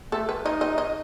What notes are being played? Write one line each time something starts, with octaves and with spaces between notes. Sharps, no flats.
A3 A4
B4
D#4 D#5
D#5
D#5